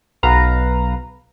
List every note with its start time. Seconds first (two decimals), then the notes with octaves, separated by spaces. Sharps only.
0.23 B1 B4 F5 A#5